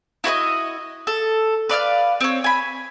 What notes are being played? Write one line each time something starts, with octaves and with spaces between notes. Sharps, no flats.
E4 F#4 C5 D#5
A4
B4 D5 F5 F6
C4 C#5
G#5 B5